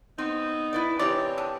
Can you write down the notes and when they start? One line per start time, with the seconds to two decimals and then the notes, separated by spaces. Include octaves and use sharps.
0.18 B3 C4 D#4
0.73 E4 B4 D5
0.99 C3 E3 C4 D#4 G4 C#5 D5
1.38 D3